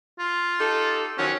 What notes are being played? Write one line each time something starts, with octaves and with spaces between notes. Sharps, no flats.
F4
D#4 G4 A4
D#3 F3 F#3 C#4